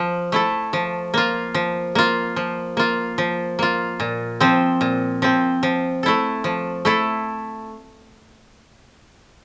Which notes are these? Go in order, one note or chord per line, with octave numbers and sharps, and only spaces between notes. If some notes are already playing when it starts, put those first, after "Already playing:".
Already playing: F3
A3 E4 A4
F3
A#3 F4
F3
A#3 F4
F3
A#3 F4
F3
A#3 F4
A#2
F3 C4
A#2
F3 C4
F3
A3 E4 A4
F3
A3 E4 A4